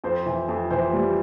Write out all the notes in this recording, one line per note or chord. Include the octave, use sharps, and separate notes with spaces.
F2 C5
E3
F2
E3 C5
G3